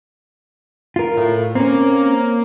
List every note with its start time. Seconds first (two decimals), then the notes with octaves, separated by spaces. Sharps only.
0.96 F4 A#4
1.17 A2
1.55 A#3 C4 C#4